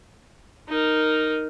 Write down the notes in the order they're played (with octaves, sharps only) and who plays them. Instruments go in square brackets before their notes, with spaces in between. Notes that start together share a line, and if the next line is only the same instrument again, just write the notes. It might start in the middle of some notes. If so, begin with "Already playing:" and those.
[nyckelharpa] D#4 A#4